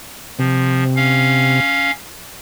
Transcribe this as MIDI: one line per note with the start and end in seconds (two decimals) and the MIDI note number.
0.39 1.60 48
0.39 0.84 53
0.96 1.91 61
0.96 1.91 77